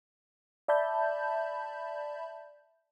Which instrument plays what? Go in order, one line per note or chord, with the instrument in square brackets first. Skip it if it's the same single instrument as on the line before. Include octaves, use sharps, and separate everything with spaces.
[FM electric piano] D5 E5 A5 B5 G6